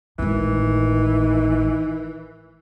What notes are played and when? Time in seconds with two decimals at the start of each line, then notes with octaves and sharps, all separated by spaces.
0.19 G#1 A2 D#3 E3